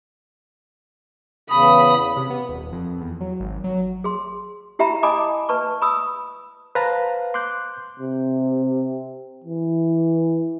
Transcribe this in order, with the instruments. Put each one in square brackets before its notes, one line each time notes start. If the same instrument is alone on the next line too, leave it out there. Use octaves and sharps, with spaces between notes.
[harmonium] E2 C#3 [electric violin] B5 [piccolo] D#6
[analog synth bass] C3
B3
D#1
F2
E2
F#3
G#1
F#3
[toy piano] G#4 C6
E4 G4 E5 G5 A#5 B5
D#5 G#5 A5 B5 D6 D#6
B4 A5 C#6
B5 D#6 E6
[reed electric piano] B4 C5 F5 A5 A#5
C6 D6 F#6 G6
[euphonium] C3
E3